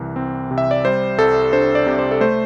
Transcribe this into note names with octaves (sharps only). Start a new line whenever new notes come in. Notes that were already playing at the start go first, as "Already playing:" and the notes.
Already playing: C2 E3
C4
C3
E5
D5
G3 C5
C2 A4
D4 C5
D5
C3
C5
A4
A3 C5